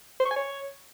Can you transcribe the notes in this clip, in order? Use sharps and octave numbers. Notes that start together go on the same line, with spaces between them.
C5
C#6
G#5
C#5